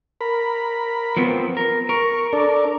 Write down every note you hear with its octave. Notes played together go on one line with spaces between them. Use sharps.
A#4 B5
F3 B3 C4
A#4
A#4 C#6
D4 A4 D5